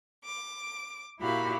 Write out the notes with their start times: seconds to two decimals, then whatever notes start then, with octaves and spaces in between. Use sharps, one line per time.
0.23 D6
1.20 A#2 E4 F#4 G4 F5 B5